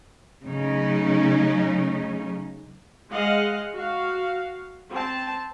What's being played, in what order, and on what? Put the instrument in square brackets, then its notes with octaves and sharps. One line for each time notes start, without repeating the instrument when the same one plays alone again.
[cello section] C#3 F#3 A3 C#4 D#4
[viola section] G#3 D#5 F5 F#5
F#4 F5
C4 A5